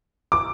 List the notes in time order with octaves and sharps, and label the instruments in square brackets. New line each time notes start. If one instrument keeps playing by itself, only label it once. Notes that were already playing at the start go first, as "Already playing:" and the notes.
[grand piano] D6